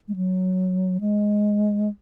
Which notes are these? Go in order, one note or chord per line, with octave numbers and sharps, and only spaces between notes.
G#3
F#3
G#3